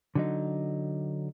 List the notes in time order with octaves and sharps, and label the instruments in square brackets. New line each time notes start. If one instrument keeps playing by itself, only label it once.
[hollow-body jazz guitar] D3 F#3 D#4